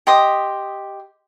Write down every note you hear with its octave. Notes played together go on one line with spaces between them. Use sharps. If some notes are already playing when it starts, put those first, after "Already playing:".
G4 D#5 C6 D#6